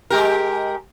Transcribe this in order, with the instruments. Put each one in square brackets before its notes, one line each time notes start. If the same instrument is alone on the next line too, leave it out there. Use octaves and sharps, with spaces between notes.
[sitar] G#3 G4 A#4